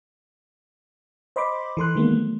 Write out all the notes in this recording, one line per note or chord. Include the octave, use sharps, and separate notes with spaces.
C5 D#5 B5 C6 D6
E3 A4 C6 F#6
D#3 E3 G#3 A#3 B3
F#3 A3